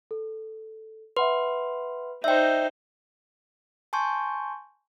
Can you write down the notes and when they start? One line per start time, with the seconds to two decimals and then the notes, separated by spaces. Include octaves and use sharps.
0.11 A4
1.17 B4 E5 F#5 C6
2.24 D#4 C5 D5 E5 G5 E6 G6
3.93 G#5 A5 C6 C#6 G6